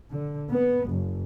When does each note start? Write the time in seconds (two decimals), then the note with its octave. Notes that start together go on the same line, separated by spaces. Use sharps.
0.12 D3
0.51 B3
0.90 F#1